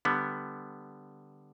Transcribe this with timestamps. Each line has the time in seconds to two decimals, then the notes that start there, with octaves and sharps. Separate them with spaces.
0.05 D3 G3 B3